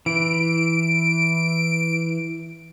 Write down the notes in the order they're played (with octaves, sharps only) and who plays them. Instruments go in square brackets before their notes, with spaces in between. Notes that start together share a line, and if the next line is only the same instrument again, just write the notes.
[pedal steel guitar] E3 [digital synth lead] D7